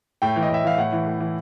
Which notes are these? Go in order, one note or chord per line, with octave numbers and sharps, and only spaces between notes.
A2 G5
E3
D#5
A2 E5
E3 F5
A2 F#5
E3
A2
E3